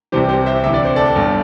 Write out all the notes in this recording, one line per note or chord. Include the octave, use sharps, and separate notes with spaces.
C2 C3 E3 G4 C5
G4 C5
C5 E5
D2 C3 E3 E5
D5
C5
A4 D5
G1 G2 D3